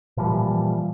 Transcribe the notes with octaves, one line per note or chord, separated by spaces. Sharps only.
A#2 E3 F3 G3